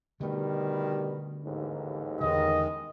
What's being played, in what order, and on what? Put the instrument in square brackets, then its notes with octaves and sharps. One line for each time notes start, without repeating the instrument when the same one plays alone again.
[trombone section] B2 D#3 G3 [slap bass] D3 A3
[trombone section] A1 D#2 G#2
[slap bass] E2 D3 [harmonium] D#3 G#3 [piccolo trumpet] D#5